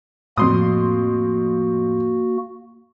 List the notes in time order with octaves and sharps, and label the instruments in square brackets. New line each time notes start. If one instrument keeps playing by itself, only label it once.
[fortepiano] F2 C6 D#6 [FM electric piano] A2 [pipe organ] A#3 F#4